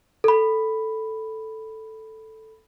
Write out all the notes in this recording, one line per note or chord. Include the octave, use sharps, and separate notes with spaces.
A4 B5